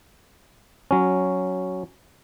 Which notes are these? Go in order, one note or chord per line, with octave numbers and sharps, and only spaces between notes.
F#3 C#4